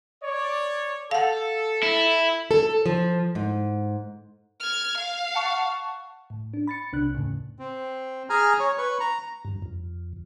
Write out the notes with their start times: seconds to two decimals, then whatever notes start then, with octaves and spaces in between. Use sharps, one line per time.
0.23 C#5 D5
1.11 A4 F5 F#5
1.83 E4
2.51 A4
2.86 F3
3.35 G#2
4.60 F6 G#6
4.97 F5
5.35 F#5 A5 C#6
6.30 A2
6.54 D4
6.67 B5 A6 C#7
6.93 C2 C3 D4 F#6
7.15 E2 A2 C#3
7.59 C4
8.30 G#4 G#5 A#5 F6
8.60 C#5
8.78 B4 C#6
9.00 A#5
9.45 G2
9.62 F2